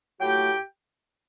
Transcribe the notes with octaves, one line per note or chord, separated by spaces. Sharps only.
A2 F#3 A3 G4 G5